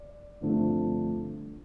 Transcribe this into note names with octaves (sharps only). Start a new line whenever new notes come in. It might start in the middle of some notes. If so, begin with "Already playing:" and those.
Already playing: D5
G2 D3 F3 A3 C4